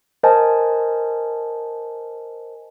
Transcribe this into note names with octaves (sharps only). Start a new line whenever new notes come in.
A#4 C5 D#5 G#5 A5